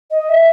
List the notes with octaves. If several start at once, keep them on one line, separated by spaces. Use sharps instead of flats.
D#5
E5